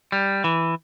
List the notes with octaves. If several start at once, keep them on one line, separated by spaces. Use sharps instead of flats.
G3
E3